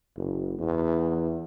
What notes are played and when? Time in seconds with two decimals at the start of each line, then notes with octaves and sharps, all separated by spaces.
0.16 F#1
0.59 E2